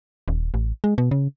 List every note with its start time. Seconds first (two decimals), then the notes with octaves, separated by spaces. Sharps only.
0.28 D#1
0.54 A1
0.84 G#3
0.98 B2
1.11 C#3